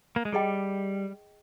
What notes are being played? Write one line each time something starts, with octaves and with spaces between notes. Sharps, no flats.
A#3
G#3
G3 G#4 D#5 G5